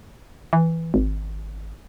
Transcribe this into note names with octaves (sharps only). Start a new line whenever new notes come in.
E3
G#1